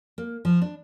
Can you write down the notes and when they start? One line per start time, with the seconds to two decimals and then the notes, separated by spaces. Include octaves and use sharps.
0.18 A#3
0.45 F3
0.62 D4